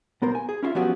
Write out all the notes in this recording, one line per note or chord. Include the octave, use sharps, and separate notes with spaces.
B1 B3 A#4 C5
G#5
G#4
C#4 E4 F4 E5
F3 F#3 B3 C#4 F#4 G4